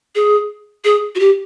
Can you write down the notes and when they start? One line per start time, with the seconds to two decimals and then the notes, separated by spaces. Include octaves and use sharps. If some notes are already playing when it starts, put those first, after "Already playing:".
0.15 G#4
0.85 G#4
1.15 F#4
1.20 G4